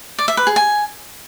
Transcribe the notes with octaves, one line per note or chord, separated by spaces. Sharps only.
D5
E5
B4
G#4
G#5